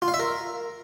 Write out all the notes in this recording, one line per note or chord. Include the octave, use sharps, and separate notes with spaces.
F4
F5
E5
A#4